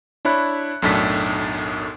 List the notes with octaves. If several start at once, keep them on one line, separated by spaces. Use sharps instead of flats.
D4 E4 C#5 B5 F#6
B1 F#2 A2 D4 A4 B6